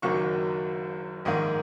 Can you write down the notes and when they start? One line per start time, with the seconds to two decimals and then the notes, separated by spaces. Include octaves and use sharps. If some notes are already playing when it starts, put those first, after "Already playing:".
0.02 F#1 F#2 D#3 F#3 A#3 C#6
1.25 A#1 G#2 D#3 A#3 D#5